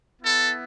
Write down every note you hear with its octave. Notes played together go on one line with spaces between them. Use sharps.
B3 E4 A4